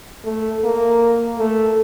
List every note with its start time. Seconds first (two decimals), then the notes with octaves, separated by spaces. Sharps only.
0.24 A3
0.64 A#3
1.39 A3